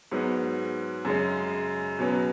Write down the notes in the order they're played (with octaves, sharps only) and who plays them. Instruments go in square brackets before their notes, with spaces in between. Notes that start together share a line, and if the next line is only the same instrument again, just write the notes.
[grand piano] G#2 F#3 B3
F#2 C#3 G#3 C#4
B2 F#3 C#4 B4